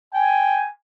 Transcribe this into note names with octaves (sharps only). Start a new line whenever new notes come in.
G5 G#5